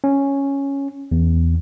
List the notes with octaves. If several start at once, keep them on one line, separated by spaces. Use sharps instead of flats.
C#4
E2